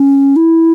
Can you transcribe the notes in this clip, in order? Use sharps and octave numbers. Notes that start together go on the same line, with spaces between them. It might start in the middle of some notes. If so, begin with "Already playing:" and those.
Already playing: C#4
E4